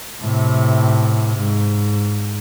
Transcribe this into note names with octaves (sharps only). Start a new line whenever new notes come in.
A2 C3
G#2